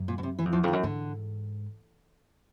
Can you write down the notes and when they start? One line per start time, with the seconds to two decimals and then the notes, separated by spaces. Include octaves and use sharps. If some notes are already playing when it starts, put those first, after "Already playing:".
Already playing: F#2
0.08 A#2
0.18 B2
0.23 C3
0.39 E3
0.45 F2
0.53 E2 F3
0.63 F2 D3
0.68 D#3
0.73 F#2
0.83 G#2 D3